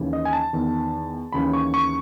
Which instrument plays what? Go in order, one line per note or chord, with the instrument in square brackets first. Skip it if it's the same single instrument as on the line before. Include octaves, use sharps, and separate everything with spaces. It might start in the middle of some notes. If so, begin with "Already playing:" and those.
Already playing: [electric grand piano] D#2 C#3 E3
D#5
G#5
A5
E2 D#3
D#2 C#3 E3 B5
C#6
C#6